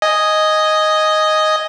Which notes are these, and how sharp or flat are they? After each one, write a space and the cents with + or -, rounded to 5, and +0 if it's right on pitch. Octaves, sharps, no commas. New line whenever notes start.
D#5 +0 G#5 +0